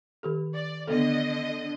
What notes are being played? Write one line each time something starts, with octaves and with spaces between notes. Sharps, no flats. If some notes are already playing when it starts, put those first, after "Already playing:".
D#3 G4 A4
D5
D3 B3 A4 D#5